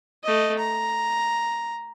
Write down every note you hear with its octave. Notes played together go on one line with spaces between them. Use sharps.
A3 D#5
A#5